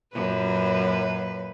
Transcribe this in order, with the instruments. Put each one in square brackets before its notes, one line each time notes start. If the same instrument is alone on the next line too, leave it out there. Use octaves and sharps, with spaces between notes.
[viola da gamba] F#2 A#2 B4